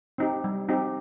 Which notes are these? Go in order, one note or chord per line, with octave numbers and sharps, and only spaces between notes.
C4 D#4 G4
G3
C4 D#4 G4